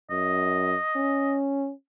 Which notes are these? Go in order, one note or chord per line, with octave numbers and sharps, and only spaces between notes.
F#2 D#5
C#4